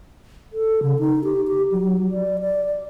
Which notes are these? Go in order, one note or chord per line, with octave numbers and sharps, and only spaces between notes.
A4
C#3
D#4
G4
G4
F#3
D5
D5